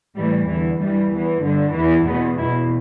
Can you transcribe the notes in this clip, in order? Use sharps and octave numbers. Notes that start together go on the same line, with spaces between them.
A2 E3 G3
E2 D3 E3
G2 E3 G3
E2 E3
G2 D3
E2 E3
E2 B2 B3
E2 B2 E4